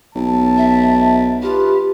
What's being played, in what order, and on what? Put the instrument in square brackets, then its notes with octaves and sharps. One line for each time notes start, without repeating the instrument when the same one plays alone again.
[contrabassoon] B1 [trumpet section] A5
[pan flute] E5
[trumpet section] F4 B4 [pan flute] G4